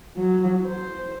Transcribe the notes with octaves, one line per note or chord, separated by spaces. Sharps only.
F#3
C5